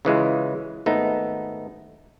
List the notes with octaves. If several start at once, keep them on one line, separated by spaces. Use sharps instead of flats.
C#3 E3 G#3 F4
G#1 A3 B3 D#4